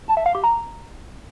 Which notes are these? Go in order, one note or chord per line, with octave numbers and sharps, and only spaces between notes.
A5
E5
F5
G4
A#5